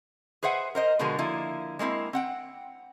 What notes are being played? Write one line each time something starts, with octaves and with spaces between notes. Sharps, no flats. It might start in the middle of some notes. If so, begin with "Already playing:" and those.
G#4 B4 C5 E5 F#5
A#4 C5 D#5
B2 D3 F3 G#3 F#4 A#4
D3 F3 A#3 E4
G#3 A#3 C4 E4
C4 F#5 G5